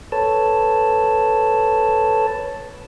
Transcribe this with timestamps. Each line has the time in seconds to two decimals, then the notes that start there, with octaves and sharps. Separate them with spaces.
0.12 A4 B4 C#5 A5